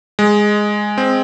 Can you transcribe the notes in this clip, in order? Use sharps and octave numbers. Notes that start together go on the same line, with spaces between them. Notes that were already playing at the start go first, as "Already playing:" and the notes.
G#3
C4